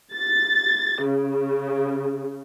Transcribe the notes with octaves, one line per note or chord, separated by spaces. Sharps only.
A6
C#3